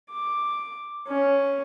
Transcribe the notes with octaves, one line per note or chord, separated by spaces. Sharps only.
D6
C#4